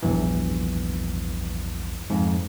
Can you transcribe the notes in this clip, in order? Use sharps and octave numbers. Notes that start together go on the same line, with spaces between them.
A#1 E2 G2 E3
F2 G#2